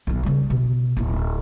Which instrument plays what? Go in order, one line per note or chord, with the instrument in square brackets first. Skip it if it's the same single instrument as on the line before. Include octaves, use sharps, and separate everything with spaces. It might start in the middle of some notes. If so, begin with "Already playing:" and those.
[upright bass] B1 D#3
C#3 G3
B2
D1 D#4